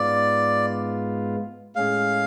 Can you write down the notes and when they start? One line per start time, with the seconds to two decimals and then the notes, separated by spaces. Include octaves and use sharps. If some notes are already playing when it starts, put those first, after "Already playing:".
Already playing: G#2 G#3 B3 F4 D5
1.76 A2 G#3 C#4 G#4 F5